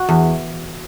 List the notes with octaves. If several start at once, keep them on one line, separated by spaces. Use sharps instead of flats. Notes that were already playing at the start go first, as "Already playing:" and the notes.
Already playing: F#4
E2